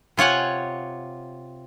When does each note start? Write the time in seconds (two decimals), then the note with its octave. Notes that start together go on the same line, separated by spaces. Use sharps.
0.17 C3 F4 C#5 F#5 G#5